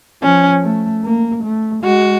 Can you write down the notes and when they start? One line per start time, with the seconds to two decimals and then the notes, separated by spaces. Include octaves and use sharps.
0.23 F3 C#4
0.63 A3
1.04 A#3
1.44 A3
1.84 G#3 F#4